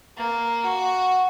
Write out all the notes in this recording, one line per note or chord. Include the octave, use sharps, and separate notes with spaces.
A#3
F#4